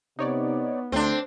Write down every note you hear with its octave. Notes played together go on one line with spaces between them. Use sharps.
C3 B3 D#4 C#5 D5
D2 A3 C4 D4 C6